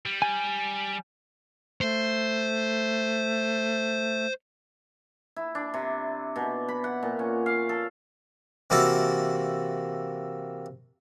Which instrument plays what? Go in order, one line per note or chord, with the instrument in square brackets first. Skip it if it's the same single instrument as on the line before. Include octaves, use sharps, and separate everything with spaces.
[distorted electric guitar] G3
[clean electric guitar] G#5
[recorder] A3 [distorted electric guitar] C5
[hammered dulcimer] E4
D4
C3
B2
B5
F#5
A#2
C#4
F5
A4
[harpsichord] C3 E3 A#3 E4 F#4 A4